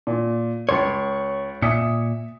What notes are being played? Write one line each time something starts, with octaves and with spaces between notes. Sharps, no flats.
A#2
C#2 C#5 C6
A#2 E5 D#6 C#7